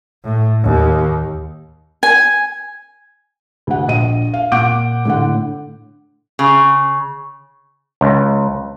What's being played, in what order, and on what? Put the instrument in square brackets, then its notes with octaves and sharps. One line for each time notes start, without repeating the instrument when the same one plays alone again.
[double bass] A2
D#2
[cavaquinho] G#5
[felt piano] D2 F#5
A#1 D#5 D#7
F5
A#2 F#5 D6 G6 D7
A2 D3 F#5
[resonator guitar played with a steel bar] C#3
[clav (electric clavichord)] C#2